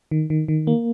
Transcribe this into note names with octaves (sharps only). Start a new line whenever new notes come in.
D#3
D#3
D#3
A#3